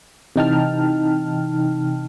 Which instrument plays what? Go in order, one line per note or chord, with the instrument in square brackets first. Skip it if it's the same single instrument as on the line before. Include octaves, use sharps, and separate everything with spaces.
[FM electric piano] C3 E3 D#4 G5 A5 F6